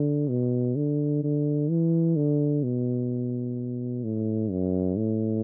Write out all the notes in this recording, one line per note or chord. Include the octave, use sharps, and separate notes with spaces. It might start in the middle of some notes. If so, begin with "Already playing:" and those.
Already playing: D3
B2
D3
D3
E3
D3
B2
A2
F#2
A2